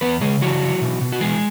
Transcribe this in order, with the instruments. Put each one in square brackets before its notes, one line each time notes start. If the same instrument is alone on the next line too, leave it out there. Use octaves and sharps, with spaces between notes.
[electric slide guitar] E2 B3 B4
C#3 G#3 G#4
E3 F#3 F#4
E3
B2
B2
F#4
E3 G#3 G#4